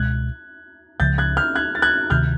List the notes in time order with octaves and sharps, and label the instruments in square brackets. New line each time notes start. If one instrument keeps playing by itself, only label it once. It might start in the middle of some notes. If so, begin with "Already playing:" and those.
Already playing: [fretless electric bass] C#2 B2 G#3 [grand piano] F#6 G#6
[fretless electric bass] C#2 C#3 F3 [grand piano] G6 A6
[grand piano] F#6 G#6
F6 G6
F#6 G#6
A6
F#6 G#6
[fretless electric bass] D2 C3 D#3 [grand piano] F6 G6